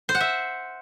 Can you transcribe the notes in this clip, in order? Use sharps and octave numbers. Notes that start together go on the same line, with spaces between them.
C5
F#5
E5